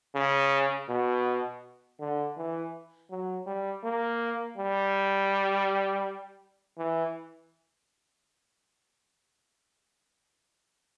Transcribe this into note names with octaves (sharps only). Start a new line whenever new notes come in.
C#3
B2
D3
E3
F#3
G3
A#3
G3
E3